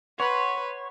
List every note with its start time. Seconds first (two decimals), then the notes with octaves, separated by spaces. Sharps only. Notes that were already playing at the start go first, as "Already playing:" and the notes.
0.20 B4 C#5 F#5 C6